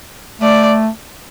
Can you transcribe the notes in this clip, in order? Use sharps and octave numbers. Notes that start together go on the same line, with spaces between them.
A3 D5